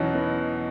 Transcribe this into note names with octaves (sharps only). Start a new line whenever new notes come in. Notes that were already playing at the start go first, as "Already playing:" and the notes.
Already playing: E2 B2 F#3 C#4 D#4 E4
B3